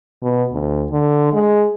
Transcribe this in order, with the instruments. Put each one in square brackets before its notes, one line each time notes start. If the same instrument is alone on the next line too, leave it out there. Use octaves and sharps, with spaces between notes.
[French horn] B2
D2
D3
G#3